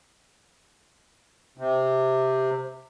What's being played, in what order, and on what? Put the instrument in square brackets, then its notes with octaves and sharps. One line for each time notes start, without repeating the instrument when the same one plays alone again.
[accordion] C3